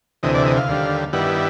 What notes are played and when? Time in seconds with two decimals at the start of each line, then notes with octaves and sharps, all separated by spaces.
0.23 D2 C3 E3 D#5
0.35 D5
0.45 D#5
0.57 F5
0.68 D#2 D3 G3
1.13 G2 D#3 G3 B3 E4 F#5